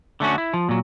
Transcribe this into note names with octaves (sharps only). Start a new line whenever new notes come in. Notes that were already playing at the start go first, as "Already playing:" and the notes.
D3 A3 C#4 F#4
E4
F3
A#2 F#3